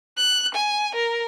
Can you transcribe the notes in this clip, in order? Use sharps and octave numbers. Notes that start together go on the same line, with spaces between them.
F#6
G#5
A#4